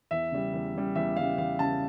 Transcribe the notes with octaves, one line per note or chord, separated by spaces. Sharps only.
E2 E5
C#3 G3
E2
C#3 G3
E2 E5
C#3 G3 F5
E2 F5
C#3 G3 A5